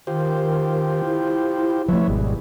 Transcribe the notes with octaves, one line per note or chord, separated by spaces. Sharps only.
D#3 F4 G4 C5
E4
F3 A3 B4 C#5 E5
G#1 B2 G3 G#3